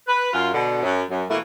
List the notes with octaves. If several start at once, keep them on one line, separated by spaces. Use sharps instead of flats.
B4
F#2 F4
B2 D3
F#2
F#2
B2 E3 A3 A#3 E4